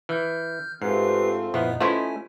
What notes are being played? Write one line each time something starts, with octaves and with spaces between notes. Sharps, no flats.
E3 F6 G6
G#2 A3 C4 F4 G4 B4 C7
F#2 A#2 F3 B3 D#4 E4
A3 C#4 E4 F4 B4 C5 G#5